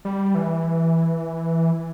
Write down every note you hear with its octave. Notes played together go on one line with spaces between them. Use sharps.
G3
E3